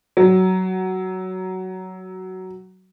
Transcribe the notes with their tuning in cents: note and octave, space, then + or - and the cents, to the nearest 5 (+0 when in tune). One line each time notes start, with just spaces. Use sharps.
F#3 +10